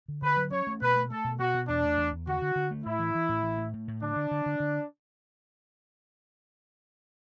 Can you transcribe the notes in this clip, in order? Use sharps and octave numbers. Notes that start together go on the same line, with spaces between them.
D3
D3 B4
F#3
C#4 C#5
A3
B2 B4
A3
A3 A4
B2
B2 F#4
B2
E2 D4
A3
E2
E2
D3 F#4
D3
D3
A3
A2 E4
E3
E3
A2
E3
A2
A2
A2
D3 D4
D3
D3
D3
D3